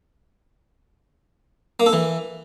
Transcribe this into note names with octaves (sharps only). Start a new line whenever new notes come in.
A#3
A4
E3